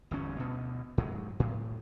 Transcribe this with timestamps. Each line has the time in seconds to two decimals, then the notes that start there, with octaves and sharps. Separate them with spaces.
0.11 G1 E2 C#4
0.37 D2 B2
0.98 G#2 F#3
1.40 A2